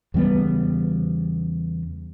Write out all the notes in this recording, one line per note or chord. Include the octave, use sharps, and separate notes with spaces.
E2 C#3 G3 B3